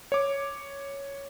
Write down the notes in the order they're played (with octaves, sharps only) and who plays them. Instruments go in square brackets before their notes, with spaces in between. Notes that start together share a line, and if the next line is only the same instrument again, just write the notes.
[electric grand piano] C#5 D6